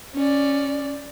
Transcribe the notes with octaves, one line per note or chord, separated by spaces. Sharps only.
C#4 D5